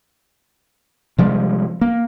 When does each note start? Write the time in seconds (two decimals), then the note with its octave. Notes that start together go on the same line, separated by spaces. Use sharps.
1.18 C3 F3 G3 G#3
1.81 A#3